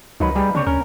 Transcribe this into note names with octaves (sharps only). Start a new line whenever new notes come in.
C#2 D#3 F#3 D#4 B4
G3 G4 G#4
C#3 A#3 C4 D4 C#5
D2 C#4 A#4